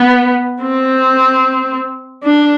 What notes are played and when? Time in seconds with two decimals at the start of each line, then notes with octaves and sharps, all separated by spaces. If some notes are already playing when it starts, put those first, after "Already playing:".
Already playing: B3
0.62 C4
2.24 D4